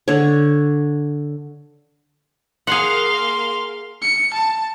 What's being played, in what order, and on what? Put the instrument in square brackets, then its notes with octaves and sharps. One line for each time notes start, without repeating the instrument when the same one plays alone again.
[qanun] D3 C#5
[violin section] A#3 F5 [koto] G#4 F#5 [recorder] C6
[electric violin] C#7
A5